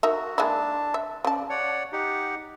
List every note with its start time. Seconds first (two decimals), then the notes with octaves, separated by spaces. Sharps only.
0.03 D#4 F#4 A#4 E5
0.38 G#3 A#3 D4 E4 A5
0.94 E5
1.24 C#3 D5 A5
1.49 C#5 D5 F#5
1.92 D#4 G4 F#5